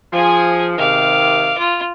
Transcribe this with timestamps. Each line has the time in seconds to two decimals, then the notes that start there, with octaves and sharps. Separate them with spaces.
0.13 F3 G#4 G#5
0.78 C3 D#3 F5 D6
1.59 F4